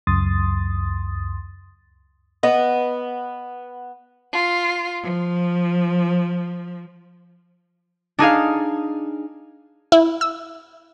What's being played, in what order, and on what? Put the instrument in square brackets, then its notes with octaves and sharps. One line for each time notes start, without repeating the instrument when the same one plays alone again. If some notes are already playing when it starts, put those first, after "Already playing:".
[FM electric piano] C#2 F#2 C6 D#6 A6
[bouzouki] B3 [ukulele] D#5
[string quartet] F4
F3
[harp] D4 D#4 G#4 F5
[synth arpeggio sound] E4
E6